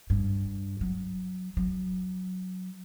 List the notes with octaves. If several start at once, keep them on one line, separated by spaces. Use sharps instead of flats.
G2
F#3
F#3